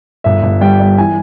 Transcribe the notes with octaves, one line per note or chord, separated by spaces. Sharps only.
G1 E5
G1
G3 G5
G3
E3 G#5